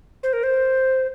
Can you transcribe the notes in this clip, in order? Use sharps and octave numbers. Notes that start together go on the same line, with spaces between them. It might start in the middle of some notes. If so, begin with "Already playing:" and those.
C5
A#4
C5